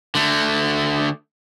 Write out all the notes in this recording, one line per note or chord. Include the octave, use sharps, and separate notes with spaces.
D3 A3